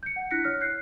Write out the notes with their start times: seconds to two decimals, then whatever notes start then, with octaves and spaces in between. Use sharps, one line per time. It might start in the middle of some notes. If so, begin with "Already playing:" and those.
0.03 G6 C#7
0.16 F#5
0.31 D4 E4 F#6 A#6 B6 C#7
0.44 C#5 F6
0.61 F#6 G6 C7